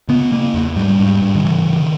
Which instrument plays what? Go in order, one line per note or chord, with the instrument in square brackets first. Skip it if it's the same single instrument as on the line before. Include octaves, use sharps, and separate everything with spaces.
[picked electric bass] C#3 B3
C#3 A#3
E2
G#2 G3
G#2
G#2
D#3
C#3 E3
C#3
D#3